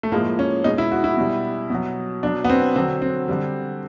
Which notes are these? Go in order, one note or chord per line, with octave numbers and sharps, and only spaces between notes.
A3
A2 F3 G#3 A#3
C#4
B2 G#3 D#4
E4
F#4
E4
B2 G3
B2 F#3
B2 F#3 D4
B3
C4
D3 F#3 C4
C4
D3 G3